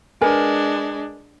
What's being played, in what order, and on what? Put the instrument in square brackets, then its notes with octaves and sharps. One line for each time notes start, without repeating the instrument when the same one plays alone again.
[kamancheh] G#3 D4 [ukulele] A#4 B4 G#5